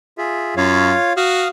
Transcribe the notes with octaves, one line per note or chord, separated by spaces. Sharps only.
F4 G#4 E5
F#2 F4 C#5 F5
F#4 F5 D#6 F6